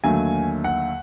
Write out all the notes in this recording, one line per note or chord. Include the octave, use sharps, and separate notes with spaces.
D#2 D3 F#3 A3 G#5
F#5